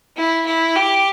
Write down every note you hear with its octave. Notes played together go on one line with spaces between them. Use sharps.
E4
E4
G4